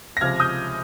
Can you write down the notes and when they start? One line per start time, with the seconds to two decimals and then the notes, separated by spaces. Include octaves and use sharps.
0.17 A#6
0.21 C#2 C3 F3 F6 G#6
0.40 D#6 G6